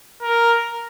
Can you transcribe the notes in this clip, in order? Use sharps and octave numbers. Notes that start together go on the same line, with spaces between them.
A#4